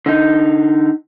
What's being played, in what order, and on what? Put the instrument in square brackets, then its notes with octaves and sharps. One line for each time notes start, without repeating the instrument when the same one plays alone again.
[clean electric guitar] D3 D#4